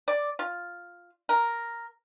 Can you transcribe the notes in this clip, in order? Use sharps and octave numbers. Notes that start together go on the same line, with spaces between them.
D5
F4
A#4